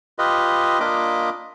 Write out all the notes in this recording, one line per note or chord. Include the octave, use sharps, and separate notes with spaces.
F4 G4 B4 D#5
A#3 D4 F4 D#5 B5 D6